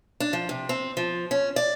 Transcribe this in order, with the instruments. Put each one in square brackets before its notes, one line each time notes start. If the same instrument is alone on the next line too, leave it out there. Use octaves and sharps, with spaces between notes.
[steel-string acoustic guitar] D4
F3
C3
C4
F3
C#4
D5